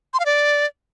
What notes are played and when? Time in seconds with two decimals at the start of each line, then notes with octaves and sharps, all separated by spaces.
0.14 C6
0.20 F5
0.26 D5